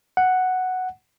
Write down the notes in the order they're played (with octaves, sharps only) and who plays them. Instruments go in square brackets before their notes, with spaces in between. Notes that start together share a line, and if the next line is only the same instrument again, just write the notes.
[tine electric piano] F#5